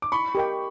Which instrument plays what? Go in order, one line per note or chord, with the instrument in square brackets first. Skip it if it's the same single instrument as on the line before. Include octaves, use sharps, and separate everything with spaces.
[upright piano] D6
[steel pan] E4 [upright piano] B5 C#6
[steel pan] G4 A#4 D#5 G5